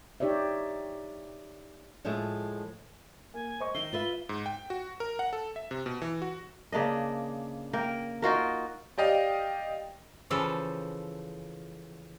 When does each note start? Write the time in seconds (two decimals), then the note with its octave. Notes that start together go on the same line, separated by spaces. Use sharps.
0.20 D#4 G4 C#5 D5 E5
2.05 A2 F3 G#3 A3 F4 E5
3.34 A#3 G#5
3.60 C5 D#5 C#6
3.75 D#3 D#4 E5 C7 G7
3.93 F4 B4 E5
4.29 G#2
4.46 G5
4.70 F#4
5.00 A#4
5.19 F#5
5.33 A4
5.56 E5
5.71 C3
5.86 B2
6.02 E3
6.22 F#4
6.72 C#3 A#3 D4 D#5
7.73 A#3 A#4 G5
8.22 D#4 F4 F#4 A#4
8.98 G4 D5 D#5 F5 G5
10.30 C#3 E3 F3 A4